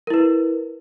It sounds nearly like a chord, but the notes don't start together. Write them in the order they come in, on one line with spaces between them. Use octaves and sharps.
A#4 E4 B4